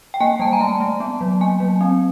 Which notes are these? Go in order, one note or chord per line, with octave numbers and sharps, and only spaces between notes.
G5
A#3 G#5
G3 A5
G#5
A#5
A3 A5
A3
B3
F#3
A#3 G#5
F#3
C4